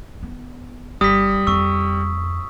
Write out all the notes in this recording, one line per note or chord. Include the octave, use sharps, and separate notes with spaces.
B3
G1 G3 D#6 B6
F2 C4 C#6 E6